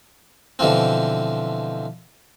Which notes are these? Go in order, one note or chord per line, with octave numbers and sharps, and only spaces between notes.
B2 D3 E3 F3 C4